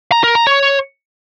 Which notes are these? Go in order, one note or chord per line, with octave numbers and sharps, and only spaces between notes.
A#5
A#4
A#5
C#5